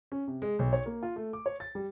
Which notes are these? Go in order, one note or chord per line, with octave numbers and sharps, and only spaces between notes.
C#4
C3
G#3
B1
C#5
A#3
F4
A3
D6
C#5
A6
G3